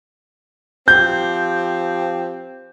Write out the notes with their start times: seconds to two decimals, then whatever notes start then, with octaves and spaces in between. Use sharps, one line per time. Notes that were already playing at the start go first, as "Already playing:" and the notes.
0.88 F3 C4 G4 G6